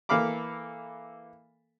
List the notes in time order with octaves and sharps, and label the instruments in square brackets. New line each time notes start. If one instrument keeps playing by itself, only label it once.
[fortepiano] E3 A#3 A4 F5 B5 D6